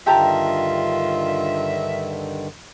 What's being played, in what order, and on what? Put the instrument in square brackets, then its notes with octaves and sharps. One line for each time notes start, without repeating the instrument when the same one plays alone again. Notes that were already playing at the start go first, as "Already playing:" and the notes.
[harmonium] G2 D3 D#3 [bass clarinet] F4 [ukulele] G4 A5 A#5 [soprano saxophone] E5